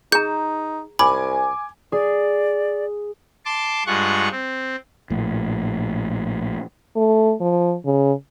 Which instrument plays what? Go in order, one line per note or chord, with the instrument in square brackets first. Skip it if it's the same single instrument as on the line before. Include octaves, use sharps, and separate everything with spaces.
[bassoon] D#4 [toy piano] G#4 A#5 [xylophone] G6
[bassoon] C2 [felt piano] G#5 D6 [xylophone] B5
[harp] G#4 [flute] D5
[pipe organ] A5 C6 D6
G2 G#3 F4 F#5 C#6
C4
[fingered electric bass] A#1 A2
[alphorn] A3
F3
C#3